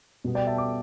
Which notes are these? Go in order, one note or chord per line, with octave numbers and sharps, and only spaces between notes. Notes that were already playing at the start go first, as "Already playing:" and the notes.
B2 G3 B3
D5 G5
E5 A5
A5 D6